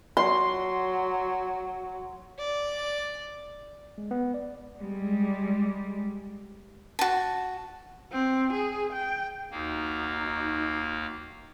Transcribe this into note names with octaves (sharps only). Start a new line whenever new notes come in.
F#3 C6
D5
G#3
B3
D5
G3 G#3
F#4 A5
C4
G#4
G5
D#2 A#3 D#4 F#4